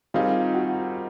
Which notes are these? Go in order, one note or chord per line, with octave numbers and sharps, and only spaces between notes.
D#3 G3 C4 D#4 F4 G#4 F5
F#4 F#5